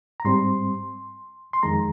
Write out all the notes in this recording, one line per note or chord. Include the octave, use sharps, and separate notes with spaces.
A#5
G#2 G3 C4 C6
C6
F2 D#3 G#3 A#5